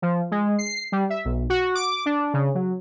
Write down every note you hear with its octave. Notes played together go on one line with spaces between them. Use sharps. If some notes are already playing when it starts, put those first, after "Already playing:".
F3
G#3
C7
G3
E5
B1
F#4
D6
D4
C#3
F#3